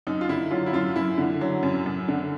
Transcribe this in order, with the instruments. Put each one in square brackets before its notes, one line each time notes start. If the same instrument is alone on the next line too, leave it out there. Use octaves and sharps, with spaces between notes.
[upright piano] F#2 D#4
F4
D3 E4
F#3 F4
E4
F#2 F4
F#2 E4
D3
F#3
F#2
F#2
D3